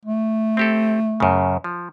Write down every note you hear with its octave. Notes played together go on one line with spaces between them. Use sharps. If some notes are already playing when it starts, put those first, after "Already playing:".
A3
C4 G4 A4
F#2 C#3
F3